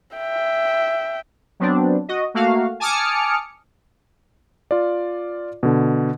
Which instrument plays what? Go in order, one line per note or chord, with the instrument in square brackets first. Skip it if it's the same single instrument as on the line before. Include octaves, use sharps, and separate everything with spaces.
[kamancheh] E5 G5
[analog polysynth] F#3 B3 C4 D4
F#4 D#5
A3 A#3 F#4 F5
G#5 A5 D6 D#6 F6 C#7
[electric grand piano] F4 D5
B2 D3